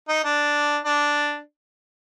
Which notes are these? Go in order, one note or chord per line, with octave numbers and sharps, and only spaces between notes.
D#4
D4
D4